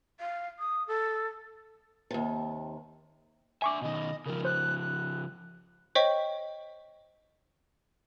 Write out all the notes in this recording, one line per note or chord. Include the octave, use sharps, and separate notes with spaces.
F5
D#6
A4
D#2 C3
D4 E5 G#5 C#6 D6
B2 D#3 D#5
C#3 F3 A#4
C5 F#6
F#6
C5 C#5 D#5 G5 C#6 B6